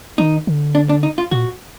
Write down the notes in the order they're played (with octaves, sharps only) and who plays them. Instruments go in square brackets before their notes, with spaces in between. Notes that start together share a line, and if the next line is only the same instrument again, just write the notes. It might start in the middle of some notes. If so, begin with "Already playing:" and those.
[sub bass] D#3 [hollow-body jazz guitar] D#4
[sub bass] D3
[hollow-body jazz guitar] D4
D4
D#4
F4
[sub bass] A#2 [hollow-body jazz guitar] F#4